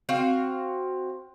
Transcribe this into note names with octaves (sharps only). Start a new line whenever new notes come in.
C4 F#4 F5